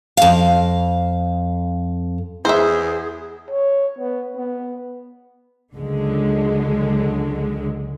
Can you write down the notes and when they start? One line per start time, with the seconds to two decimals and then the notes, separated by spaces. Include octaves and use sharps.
0.17 F2 F5
2.45 E2 G#4 C5 E5
3.50 C#5
3.99 B3
4.37 B3
5.74 C#2 D3 F#3 G#3